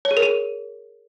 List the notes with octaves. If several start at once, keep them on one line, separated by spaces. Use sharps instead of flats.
C#5
G#4
A#4
G#4